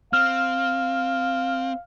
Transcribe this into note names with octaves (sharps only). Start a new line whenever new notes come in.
C4 F5 F6